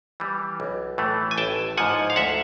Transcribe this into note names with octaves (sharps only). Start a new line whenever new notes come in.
E3 G3
B1
A2 E3 A3
G#5
A1 G5 A5
G#2 F3 F#5 G#5
F5
D2 E5 F#5